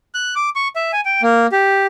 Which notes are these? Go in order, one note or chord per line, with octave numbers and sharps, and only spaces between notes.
F#6
D6
C#6
E5
G#5
G5
A#3
G4